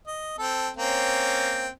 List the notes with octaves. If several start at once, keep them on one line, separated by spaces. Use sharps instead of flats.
D#5
C4 A4
A#3 C4 C#4